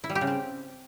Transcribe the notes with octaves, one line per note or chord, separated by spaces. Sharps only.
E4
G3
G4
C#3
C4